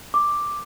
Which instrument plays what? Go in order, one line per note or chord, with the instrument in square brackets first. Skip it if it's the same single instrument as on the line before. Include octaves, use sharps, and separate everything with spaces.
[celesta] D6